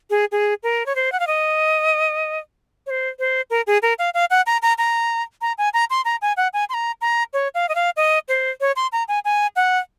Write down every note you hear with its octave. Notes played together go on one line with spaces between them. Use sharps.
G#4
G#4
A#4
C#5
C5
F#5
F5
D#5
C#5
C5
C5
A#4
G#4
A#4
F5
F5
F#5
A#5
A#5
A#5
A#5
G#5
A#5
C6
A#5
G#5
F#5
G#5
C6
A#5
A#5
C#5
F5
D#5
F5
D#5
C5
C#5
C6
A#5
G#5
G#5
F#5